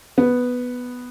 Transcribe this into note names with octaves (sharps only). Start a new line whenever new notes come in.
B3